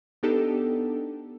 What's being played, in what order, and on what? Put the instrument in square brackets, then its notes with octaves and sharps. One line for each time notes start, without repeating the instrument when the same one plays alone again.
[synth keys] B3 D4 D#4 G4 A4